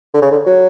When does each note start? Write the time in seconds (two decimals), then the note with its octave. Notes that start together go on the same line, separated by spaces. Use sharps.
0.14 D3
0.22 C#3
0.31 D3
0.46 F#3